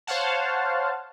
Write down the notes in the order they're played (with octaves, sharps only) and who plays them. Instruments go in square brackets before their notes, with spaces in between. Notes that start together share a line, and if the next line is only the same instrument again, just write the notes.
[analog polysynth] C5 C#5 F5 F#5 A5